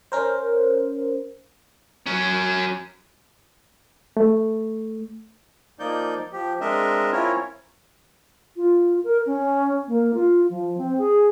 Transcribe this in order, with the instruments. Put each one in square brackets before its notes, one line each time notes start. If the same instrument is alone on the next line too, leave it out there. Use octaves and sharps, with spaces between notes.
[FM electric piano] C#4 A#4 C5
[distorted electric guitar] F#3 C#4
[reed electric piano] A3
[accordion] F3 A#3 D#4 D5 G6
F3 G4
G#3 C4 D4 A#4 D#5 E5
C4 C#4 E4 F4 A#4 C#5
[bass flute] F4
A#4
C#4
A#3
F4
F3
C4
G#4